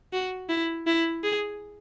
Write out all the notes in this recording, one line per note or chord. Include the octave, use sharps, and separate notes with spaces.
F#4
E4
E4
G#4